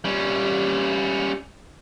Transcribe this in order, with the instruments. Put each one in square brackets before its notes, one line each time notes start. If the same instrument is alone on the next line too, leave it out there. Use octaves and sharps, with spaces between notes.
[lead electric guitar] G3 C#4